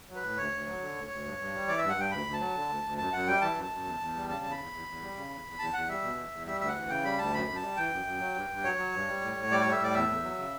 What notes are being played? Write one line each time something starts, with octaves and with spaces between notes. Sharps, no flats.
F#3
B4
A2
D2 C#5
D2
F#3
D3
D2
D2
G2
G2
G3
E3 D5
G2 E5
F#5
G2 G5
D2 B5
D2
A5
F#3
D3
D2
D2
F#2 A5
F#2 F#5
G3 G5
E3 A5
F#2
A5
F#2
E2
E2
G3
C#3 A5
E2
B5
E2
E2
E2
G3
C#3
E2
E2
E2 A5
E2 F#5
G3 E5
B2
E2
E2
G3 E5
D2 E5
F#5
E3
C#3 G5
G3 B5
D2 A5
F#2 B5
F#2
A5
G3
E3 G5
F#2
F#2
F#3
G2
G2
F#3 C#5
F#3
G2
G3
A2
A2
G3 D5
G3 C#5
E5
A2 D5
E2 E5
E2
F#3
C#3